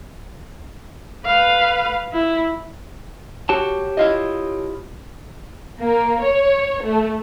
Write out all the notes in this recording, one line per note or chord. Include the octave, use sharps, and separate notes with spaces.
B4 F5
E4
F#4 G4 C#5 A5
E4 F4 D#5
A#3
C#5
A3